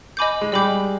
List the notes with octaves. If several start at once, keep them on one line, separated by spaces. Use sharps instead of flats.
D#5 G#5 B5 D6 G6
G#3
G3 D#5 B5 D6 G6